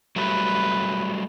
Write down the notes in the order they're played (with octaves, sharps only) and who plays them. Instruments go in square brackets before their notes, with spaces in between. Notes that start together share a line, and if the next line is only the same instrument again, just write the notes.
[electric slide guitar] F#3 G3 A3 [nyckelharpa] B4